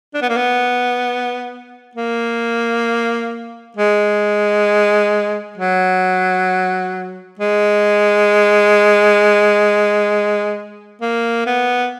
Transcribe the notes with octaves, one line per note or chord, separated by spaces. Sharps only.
D4
B3
A#3
B3
A#3
G#3
F#3
G#3
A#3
B3